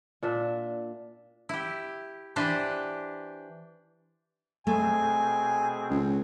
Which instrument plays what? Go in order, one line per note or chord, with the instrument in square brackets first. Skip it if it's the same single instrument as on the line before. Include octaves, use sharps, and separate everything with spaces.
[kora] A#2 D4 E5
[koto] E4 G4
E3 D4 G4 B4 C5
[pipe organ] B2 C4 G#4 [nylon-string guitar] A3 [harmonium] G#5
[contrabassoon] C#2